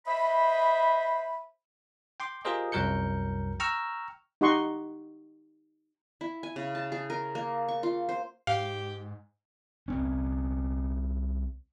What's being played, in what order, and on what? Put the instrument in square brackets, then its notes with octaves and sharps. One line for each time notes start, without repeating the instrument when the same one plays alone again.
[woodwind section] C5 D#5 E5 B5
[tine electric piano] G5 C6 D6
F4 G4 G#4 A#4 C5 D#5
C2 F#2 F#3 A#4 G6 C#7
G5 A#5 C#6 E6 F6
[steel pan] D#4 G4 D#5 F#5 C6 C#6
[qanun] E4
G#5
C#3
A5
G#4
A#4
A#3
C#6
F4
C5
[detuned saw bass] G#2 [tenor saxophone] G4 [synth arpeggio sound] F5
[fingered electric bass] C2 C4 C#4